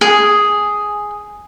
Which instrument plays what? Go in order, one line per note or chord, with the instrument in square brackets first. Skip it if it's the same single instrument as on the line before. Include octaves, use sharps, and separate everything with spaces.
[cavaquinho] G#4